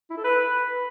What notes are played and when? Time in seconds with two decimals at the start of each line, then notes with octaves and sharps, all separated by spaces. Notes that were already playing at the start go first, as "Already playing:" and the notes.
0.10 E4
0.17 A4
0.24 B4